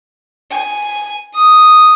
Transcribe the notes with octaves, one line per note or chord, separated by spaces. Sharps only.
G#5
D#6